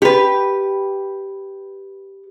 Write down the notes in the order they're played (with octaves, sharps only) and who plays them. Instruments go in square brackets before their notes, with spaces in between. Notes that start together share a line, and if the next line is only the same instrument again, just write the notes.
[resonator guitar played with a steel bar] G4 B4